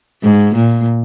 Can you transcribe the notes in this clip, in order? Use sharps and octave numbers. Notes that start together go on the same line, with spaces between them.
G#2
A#2